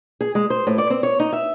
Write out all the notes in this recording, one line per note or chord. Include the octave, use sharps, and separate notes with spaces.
G#4
G#3
C5
A2
D5
C4
C#5
D#4
E5